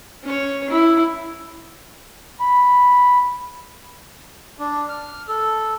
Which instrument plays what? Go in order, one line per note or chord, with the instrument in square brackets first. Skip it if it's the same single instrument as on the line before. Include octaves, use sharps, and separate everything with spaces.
[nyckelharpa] C#4 C#5
E4
[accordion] B5
[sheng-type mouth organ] D4
F6
A4